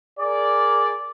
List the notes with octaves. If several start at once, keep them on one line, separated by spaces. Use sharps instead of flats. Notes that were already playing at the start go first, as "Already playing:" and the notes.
G#4 A#4 D5